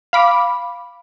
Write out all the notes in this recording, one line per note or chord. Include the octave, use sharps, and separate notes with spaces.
F5 B5 D6